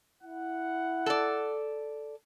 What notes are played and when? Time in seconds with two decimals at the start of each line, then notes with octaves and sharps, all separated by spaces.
0.24 E4 F#5
1.06 A4 D5